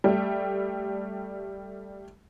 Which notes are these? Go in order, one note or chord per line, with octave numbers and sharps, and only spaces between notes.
G3 A3